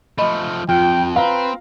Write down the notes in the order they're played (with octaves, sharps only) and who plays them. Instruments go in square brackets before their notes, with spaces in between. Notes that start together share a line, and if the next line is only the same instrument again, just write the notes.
[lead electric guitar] F3 A3 [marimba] D#5 B5
[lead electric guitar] F2 [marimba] F4 [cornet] G5
[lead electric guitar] C4 [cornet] B4 [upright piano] F5 A#5